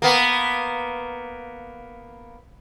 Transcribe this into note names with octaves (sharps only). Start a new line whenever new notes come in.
A#3 B3